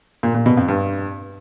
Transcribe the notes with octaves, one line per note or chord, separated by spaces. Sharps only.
A#2
A#2
B2
F2
G2